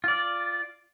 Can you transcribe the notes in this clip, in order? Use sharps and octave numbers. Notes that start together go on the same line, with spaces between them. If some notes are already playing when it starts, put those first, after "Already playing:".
F4 D5